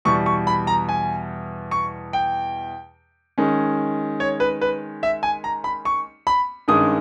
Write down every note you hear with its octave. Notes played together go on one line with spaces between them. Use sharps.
E2 B2 G3 C#6
C#6
B5
A#5
G#5
C#6
G5
D#3 G#3 C#4
C#5
B4
B4
E5
G#5
A#5
B5
C#6
B5
G2 D#3 G#3 C#4 D#6